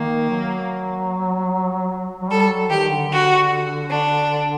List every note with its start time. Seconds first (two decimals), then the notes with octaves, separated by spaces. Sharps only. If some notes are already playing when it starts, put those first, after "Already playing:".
Already playing: D#3 A#3
0.30 F#3
2.22 F#3
2.30 G3 A4
2.50 F#3
2.70 D#3 G4
2.91 D3
3.10 D3 F#4
3.91 D4